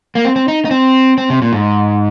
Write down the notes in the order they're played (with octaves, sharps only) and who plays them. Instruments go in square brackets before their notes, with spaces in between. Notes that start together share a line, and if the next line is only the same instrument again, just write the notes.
[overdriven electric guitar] A#3
C4
C4
D#4
D#4
C4
C4
C3
A#2
G#2